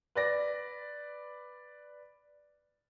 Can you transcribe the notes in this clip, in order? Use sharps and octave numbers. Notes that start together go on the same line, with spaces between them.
B4 D5 A#6